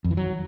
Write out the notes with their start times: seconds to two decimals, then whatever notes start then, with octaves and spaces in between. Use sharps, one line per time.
0.04 F2
0.11 E3
0.17 F#3